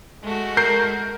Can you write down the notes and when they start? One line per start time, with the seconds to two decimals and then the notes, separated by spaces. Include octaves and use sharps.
0.23 G#3 A3 F#4
0.57 A#4 G6 C7